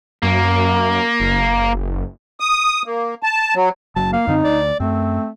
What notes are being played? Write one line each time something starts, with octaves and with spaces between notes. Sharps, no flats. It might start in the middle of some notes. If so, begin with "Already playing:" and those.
F#2 A#3
F#1
D#6
A#3
A5
F#3
F#1 F#3 A5
A#3 F5
F#2 D3 C4 D#4
D2 D5
F#2 A3 C4